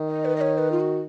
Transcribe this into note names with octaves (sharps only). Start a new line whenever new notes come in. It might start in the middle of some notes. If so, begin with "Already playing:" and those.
Already playing: D#3
D#5
B4
D#5
C#5
B4
F4
F#4